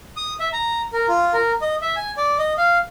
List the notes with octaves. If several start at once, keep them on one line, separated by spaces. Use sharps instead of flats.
D#6
E5
A#5
A#4
F4
A#4
D#5
E5
G#5
D5
D#5
F5